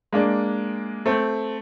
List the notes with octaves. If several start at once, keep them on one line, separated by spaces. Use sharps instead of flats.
G#3 A#3 D4
A3 C4